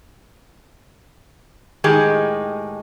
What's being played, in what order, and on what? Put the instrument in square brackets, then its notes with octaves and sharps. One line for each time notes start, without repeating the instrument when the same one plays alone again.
[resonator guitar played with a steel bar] A2 D#3 G#3 D#4 G4 G#4